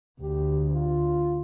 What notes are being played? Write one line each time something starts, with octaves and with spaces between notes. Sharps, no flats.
D2 G4
F4